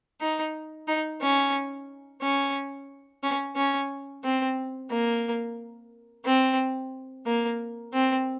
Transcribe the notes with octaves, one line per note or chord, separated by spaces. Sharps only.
D#4
D#4
C#4
C#4
C#4
C#4
C4
A#3
C4
A#3
C4